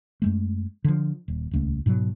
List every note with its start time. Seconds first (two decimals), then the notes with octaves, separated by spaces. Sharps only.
0.22 F#2 G#3 A3
0.84 D3 F3
1.28 D#1
1.51 D#1 C#2 A3
1.86 G#2 B2 E3 F#3